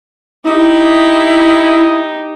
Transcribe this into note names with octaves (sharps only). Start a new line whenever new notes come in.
D#4 E4 G4